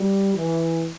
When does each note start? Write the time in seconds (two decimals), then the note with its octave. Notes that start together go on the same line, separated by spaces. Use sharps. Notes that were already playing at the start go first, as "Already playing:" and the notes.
Already playing: G3
0.33 E3